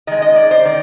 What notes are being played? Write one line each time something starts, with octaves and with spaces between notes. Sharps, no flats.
D#3 G#3 D#5
D#5
D5
C5
D#3 D5